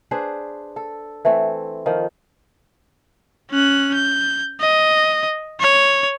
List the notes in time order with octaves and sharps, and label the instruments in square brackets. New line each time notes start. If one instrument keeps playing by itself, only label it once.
[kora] D4 G#4 B4 C5
A4
E3 A3 C4
D#3 F3
[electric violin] C#4 F#6
G6
D#5
C#5